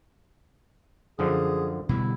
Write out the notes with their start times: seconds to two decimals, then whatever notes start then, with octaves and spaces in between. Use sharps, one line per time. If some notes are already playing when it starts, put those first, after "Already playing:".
1.19 F#2 D3 F3 G#4
1.89 B2 D3 G3 E4